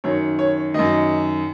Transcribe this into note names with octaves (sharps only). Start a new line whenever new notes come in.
F#2 D#3 C#5
C#5
F#2 D#3 D#5